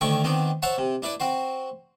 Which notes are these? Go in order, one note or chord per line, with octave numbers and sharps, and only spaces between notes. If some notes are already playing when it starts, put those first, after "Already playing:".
D2 D3 D#3 A3 G5 C#6
D#3 B3 C4 D4
C5 C#5 E5 F#5 A5
C3
D4 E4 B4 D5
C4 F#4 C5